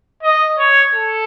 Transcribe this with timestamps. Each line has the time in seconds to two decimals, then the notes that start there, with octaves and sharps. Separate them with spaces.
0.23 D#5
0.59 C#5
0.94 A4